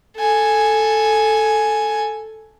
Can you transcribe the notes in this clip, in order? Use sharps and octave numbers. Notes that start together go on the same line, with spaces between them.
A4 G#5